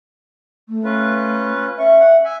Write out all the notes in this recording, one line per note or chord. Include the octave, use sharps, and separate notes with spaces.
A3
C#4 F4 B4
C#4 E5 C#6
F#5
E5 G#5